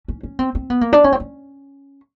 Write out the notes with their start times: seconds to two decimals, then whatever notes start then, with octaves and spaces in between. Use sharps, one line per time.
0.08 C#4
0.23 C#4
0.39 C4
0.55 C4
0.70 B3
0.81 A#3
0.93 D4
1.04 C#4
1.12 C4
1.20 C#4